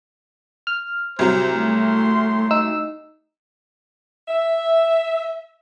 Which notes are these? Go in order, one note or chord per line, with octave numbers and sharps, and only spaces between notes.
F6
C2 F#3 C5
A3 C6
D#4 E6
E5